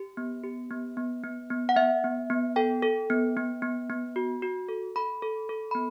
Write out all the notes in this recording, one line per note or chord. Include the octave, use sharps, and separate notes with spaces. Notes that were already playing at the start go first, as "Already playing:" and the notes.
Already playing: G4
B3
G4
B3
B3
B3
B3
F#5
B3 E5
B3
B3
A4 G5
A4
B3
B3
B3
B3
F#4
F#4
A4
A4 B5
A4
A4
B5
B3